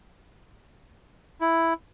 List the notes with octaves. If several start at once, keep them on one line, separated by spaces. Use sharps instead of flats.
E4